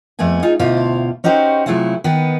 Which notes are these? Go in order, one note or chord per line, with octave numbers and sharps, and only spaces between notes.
F2 A3 B3 G#4 G#5
D#4 F4 G#4
D2 B2 E4 F4 C5 F5
C#4 D#4 F#4 G4 C5
C3 F#3 A3 E4 F4 G#4
D#3 B3 B4